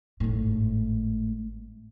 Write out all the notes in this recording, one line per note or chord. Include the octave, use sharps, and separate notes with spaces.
G#1 A2